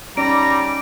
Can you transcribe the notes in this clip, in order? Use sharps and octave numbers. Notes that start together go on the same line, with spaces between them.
G3 C#4 D#4 D5 A#5 D7